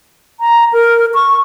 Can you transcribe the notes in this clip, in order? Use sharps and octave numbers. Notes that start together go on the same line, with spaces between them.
A#5
A#4
C#6